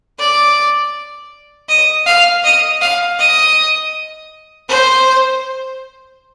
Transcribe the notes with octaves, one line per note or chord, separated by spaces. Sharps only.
D5
D#5
F5
D#5
F5
D#5
C5